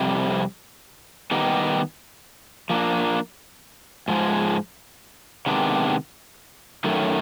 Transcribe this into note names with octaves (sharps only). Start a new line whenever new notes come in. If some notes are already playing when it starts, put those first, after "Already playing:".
Already playing: F2 C3 G3
D#3 G3 B3 D#4 G4
F3 A#3 D4
G#2 F3 G#3
C3 D#3 G#3 B3 D4
F#2 D#3 F#3 A3